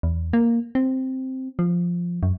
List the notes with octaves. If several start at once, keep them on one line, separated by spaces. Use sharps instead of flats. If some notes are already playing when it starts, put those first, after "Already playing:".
E2
A#3
C4
F3
F#2